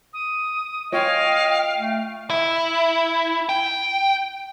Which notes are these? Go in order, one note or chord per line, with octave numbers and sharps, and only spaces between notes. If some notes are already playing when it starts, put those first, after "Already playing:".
D#6
F4 C#5 D#5 F5 G5
A3
E4
G5